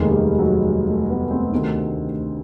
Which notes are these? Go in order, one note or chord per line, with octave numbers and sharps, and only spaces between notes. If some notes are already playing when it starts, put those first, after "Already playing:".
Already playing: F1 D#2 D#3 G#3
G3
F#3
G3
A3
B3
C4
D2 C3 D#3